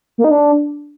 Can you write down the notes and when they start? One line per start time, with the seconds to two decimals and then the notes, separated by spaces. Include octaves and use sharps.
0.18 A#3
0.24 D#4
0.31 D4